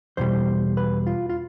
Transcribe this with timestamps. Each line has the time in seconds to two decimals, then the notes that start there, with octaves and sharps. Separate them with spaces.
0.17 E2 B2 G3 C5
0.77 B4
1.07 F4
1.29 F4